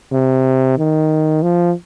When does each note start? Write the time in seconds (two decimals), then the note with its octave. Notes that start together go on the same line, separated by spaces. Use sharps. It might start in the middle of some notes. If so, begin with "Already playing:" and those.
0.12 C3
0.78 D#3
1.43 F3